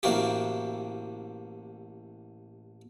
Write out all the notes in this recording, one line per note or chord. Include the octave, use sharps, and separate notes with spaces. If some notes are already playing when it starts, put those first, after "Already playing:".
A1 C3 A#3 F#4 G4